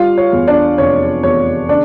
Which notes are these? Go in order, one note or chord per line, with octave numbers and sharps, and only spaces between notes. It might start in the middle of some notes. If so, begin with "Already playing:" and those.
Already playing: G3 F4 F5
C#5
E2
D4 D5
F1 C#5
E2 C#5
C#3 D4 D5